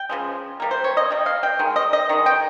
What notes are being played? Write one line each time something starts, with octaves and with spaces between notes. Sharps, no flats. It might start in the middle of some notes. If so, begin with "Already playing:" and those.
Already playing: G5
C#3 F3 G#3
C3 G3 A#3
C5
C#5
D#5
C3 G3
F5
G5
D#3 G#3
D#5
D#5
D#3 G#3
G5